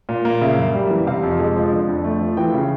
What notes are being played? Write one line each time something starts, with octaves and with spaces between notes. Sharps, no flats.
A#2
A#3
C#3 E5
F#2
G3
E3
C3 F5
F2
G#3
F3
D3
F2
A3
F3
E3 G5
C#3